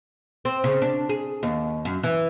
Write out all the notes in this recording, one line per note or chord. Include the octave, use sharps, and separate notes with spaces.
C4
C#3
D4
G#4
D#2
F#2
E3